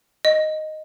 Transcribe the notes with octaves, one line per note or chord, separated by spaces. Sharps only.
D#5